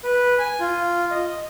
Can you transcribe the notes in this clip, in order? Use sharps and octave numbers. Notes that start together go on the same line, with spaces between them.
B4
G#5
F4
D#5